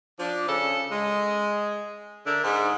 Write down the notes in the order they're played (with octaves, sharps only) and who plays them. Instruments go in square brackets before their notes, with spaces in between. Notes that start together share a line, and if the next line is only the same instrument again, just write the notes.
[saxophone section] F3 D4
C#3 A4
G#3
D3 D4 A#4 E5
G#2